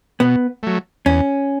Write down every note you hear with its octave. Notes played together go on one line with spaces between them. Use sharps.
B2 B3
F#3 A3
E2 C#4